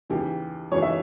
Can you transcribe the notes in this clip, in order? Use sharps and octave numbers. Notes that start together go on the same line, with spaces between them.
D#2 C#3 E3 G4
D#2 C#3 E3 C#5
E5